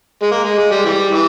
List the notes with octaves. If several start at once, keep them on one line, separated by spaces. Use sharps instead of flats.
G#3
A#3
G#3
G#3
G3
E3 G3
E3